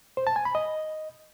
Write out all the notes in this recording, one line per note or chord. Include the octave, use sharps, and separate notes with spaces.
C5
A5
G#5
B5
D#5